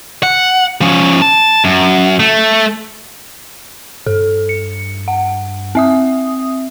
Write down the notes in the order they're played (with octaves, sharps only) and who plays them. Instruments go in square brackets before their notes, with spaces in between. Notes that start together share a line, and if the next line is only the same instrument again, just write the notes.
[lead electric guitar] F#5
F3 C#4
A5
F#2
A3
[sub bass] G2 [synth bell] A4
[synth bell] C#7
F#5
C4 E5 D#6